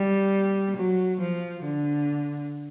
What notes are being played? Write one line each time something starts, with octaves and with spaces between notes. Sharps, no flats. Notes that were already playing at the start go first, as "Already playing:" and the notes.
Already playing: G3
F#3
F3
D3